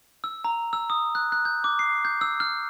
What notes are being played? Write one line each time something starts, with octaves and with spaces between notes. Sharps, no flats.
E6
A#5
E6
D#6
F#6
F#6
G6
D6
C7
G6
E6
F6